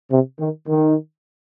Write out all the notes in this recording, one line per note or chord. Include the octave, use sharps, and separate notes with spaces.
C3
D#3
D#3